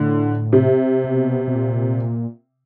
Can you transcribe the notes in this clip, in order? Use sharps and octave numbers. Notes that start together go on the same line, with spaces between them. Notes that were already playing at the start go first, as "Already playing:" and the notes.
Already playing: A2 D3
C3
B2
B2
A#2